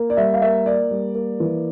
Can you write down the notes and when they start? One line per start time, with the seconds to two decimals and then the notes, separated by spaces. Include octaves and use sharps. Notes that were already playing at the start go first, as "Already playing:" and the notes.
Already playing: A#3
0.10 D5
0.17 G3 E5
0.34 F5
0.42 A#3 E5
0.66 A#3 D5
0.91 G3
1.15 A#3
1.40 E3